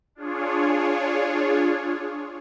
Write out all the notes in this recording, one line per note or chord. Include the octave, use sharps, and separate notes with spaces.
D4 F4 G#4 C#5